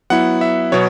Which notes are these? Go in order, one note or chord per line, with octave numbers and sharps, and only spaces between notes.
F#3 B3 E4 F#5
E5
B2 F#3 B3 C#5